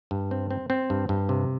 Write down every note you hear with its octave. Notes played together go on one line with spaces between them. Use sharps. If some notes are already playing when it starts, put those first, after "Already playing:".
G2
C4
C4
C4
G2
G2
C3